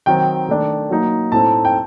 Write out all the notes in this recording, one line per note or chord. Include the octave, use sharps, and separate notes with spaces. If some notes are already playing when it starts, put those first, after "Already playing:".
D#3 F#3 C4 D#4 G5
D#3 A3 D4
F#3 A#3 D#4
A2 A3 C4 D#4 A5
G5